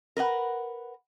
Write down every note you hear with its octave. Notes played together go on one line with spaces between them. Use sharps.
A#4 B4 D5 F#5